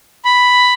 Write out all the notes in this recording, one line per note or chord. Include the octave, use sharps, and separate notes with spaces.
B5